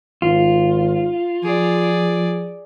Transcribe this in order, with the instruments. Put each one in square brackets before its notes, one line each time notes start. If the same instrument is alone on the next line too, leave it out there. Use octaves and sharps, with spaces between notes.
[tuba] G#1 [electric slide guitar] F4
[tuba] F3 [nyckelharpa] G#4 D5